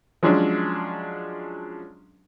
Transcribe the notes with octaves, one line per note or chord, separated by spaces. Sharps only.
F3 F#3 G#3 C#4 D4